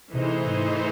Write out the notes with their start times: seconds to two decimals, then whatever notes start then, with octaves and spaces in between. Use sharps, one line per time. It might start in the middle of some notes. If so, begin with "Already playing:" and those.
0.13 C3 E3 A3 D#4 G#4 C5
0.43 G#2